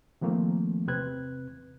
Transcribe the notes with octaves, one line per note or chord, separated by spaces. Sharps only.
D#3 F3 A3 A#3 C4
E2 C3 C4 B4 F#6 G#6